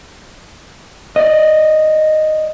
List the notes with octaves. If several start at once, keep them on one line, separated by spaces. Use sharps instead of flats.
D5 D#5